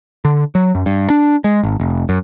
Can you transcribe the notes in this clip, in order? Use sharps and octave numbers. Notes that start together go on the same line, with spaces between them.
D3
F#3
F#2
G2
D4
G#3
G#1
F1
F#2